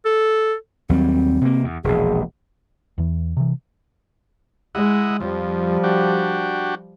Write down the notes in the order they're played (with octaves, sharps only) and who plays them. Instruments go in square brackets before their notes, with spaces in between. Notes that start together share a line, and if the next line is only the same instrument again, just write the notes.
[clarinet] A4
[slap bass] D#2 F#3 G3 [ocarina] C4
[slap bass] C3 A#3
E2
[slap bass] E1 A#1 [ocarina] G#4
[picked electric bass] E2 E3
C3 E3
[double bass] G#3 [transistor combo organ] E4 D#5 F#5
[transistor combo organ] F2 [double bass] F3 G3
[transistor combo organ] D4 F#4 G4